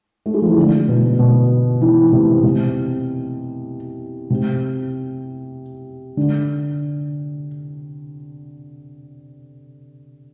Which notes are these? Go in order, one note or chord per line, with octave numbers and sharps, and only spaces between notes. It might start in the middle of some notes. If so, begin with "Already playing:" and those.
A3
G#3
F3
E3
D3
B2
B2
E3
C3
C3
C3
D3